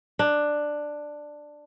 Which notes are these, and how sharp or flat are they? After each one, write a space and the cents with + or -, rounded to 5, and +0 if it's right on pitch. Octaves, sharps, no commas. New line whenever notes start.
D4 +10